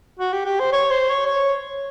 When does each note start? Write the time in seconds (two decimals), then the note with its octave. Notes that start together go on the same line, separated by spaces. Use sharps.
0.19 F#4
0.33 G4
0.46 G4
0.60 C5
0.73 C#5
0.91 C5
1.09 C#5
1.26 C#5